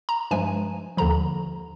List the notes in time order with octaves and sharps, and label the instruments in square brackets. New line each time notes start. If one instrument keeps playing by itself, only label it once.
[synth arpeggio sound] A#5
G2 F3 G#3 G#5
D#2 D3 F3 A#5